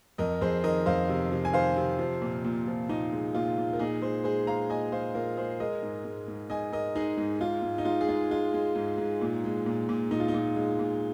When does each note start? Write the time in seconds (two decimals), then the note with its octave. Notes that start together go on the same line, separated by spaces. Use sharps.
0.18 F2 A#4 D#5
0.41 F2 G#4 C5
0.64 D#3 A#4 D#5
0.86 F2 C5 F5
1.09 C3
1.32 C3
1.45 G#5
1.53 D#3 C5 F5
1.77 C3
1.99 F3
2.22 A#2
2.45 A#2
2.67 F3
2.89 A#2 D#4
3.12 G#3
3.35 A#2 F4
3.58 A#2
3.73 A#4
3.79 A#2 D#4 G#4
4.02 G#3 G#4 C5
4.24 G#3 G#4 C5
4.47 G#3 F5 A#5
4.70 A#2 D#5 G#5
4.92 G#3 C5 F5
5.14 A#2 F4 A#4
5.37 G#3 G#4 C5
5.60 G#3 A#4 D#5
5.83 G#2
6.05 G#2
6.28 G#2
6.50 G#2 D#5 G#5
6.73 G#2 A#4 D#5
6.95 G#3 D#4 G#4
7.17 G#2 D#4
7.40 G#2 F4
7.62 G#2
7.78 D#4
7.85 G#2 F4
8.01 G#4
8.09 G#3 F4
8.31 G#3 F4
8.54 G#3
8.75 G#2
8.98 G#2
9.21 A#2
9.44 G#3
9.66 A#2
9.89 A#2
10.11 A#2 D#4
10.20 F4
10.28 D#4
10.34 A#2
10.56 G#3
10.79 A#2